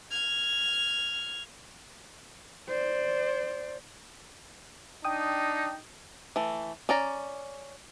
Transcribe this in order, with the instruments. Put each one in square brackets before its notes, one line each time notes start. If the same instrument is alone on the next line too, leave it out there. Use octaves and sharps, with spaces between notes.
[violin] F6 G#6
[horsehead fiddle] C5 D5
[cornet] D4 [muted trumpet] D#4 [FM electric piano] G5 D#6
[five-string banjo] E3 A3
C#4 D5 A#5